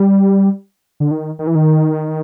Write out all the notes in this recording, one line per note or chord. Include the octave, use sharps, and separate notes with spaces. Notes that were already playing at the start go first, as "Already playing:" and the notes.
Already playing: G3
D3
D#3
D#3
E3
D#3